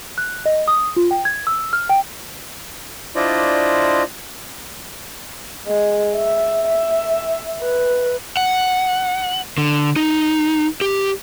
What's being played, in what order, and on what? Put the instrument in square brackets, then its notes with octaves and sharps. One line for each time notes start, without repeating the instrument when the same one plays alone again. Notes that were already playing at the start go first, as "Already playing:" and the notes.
[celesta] F#6
D#5
D#6
F4
G5
G#6
E6
F6
G5
[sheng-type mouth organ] D4 E4 F4 C5 D5 D#5
[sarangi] G#3
E5
E5
B4
[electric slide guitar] F#5
D3
D#4
G4